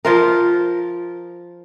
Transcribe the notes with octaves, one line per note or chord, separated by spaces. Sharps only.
F3 F4 A#4